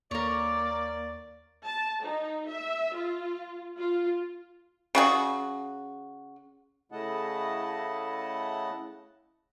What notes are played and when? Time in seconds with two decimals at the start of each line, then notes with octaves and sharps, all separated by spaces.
0.11 D#2 A#3 A#4 C#5 D5
1.66 A5
2.03 D#4
2.48 E5
2.95 F4
3.78 F4
4.95 C#3 F#4 G#4
6.92 C#3 A3 E4 D#5 F#5 A5